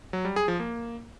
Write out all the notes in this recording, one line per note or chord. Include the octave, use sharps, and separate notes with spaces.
F#3
G3
G#4
F3
A#3